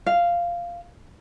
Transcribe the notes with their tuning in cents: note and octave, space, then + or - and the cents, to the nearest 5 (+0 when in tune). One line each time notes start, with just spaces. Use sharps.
F5 -10